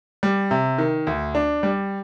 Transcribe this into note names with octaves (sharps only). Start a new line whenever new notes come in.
G3
C3
D#3
D2
D4
G3